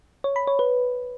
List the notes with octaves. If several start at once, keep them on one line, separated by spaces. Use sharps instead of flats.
C#5
B5
C#5
B4